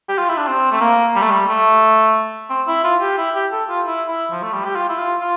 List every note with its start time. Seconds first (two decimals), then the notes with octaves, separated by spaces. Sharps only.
0.09 G4
0.18 F4
0.29 E4
0.38 D4
0.47 C4
0.71 A3
0.81 A#3
1.16 G3
1.22 A3
1.31 G3
1.49 A3
2.50 C4
2.68 E4
2.84 F4
3.01 G4
3.18 E4
3.35 G4
3.52 A4
3.69 F4
3.86 E4
4.08 E4
4.31 F3
4.42 A3
4.53 G3
4.65 G4
4.76 F4
4.89 E4
4.98 F4
5.21 F4